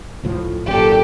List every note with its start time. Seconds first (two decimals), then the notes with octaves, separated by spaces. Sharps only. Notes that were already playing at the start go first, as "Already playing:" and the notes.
0.24 C#2 A2 F3
0.66 G#1 F#2 A#2 G4 A4